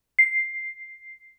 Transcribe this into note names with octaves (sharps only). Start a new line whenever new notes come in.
C7